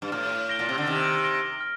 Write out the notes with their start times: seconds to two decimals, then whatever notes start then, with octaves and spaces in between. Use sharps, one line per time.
0.02 G2
0.12 A2 F6
0.49 A#6 D7 G7
0.59 A#2
0.69 C3
0.78 D3
0.86 C3 D#3 F6
1.24 A#6 D7 G7
1.61 F6